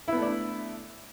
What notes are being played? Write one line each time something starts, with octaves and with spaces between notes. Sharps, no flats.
A3 B3 D4 E4 D5